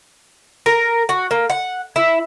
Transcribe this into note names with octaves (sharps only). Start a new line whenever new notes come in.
A#4
F#4
A#3
F#5
E4